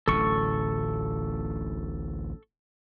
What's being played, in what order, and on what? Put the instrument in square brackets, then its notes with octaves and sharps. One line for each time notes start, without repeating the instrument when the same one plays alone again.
[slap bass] D1 A1 D2 [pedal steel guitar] A4 C#6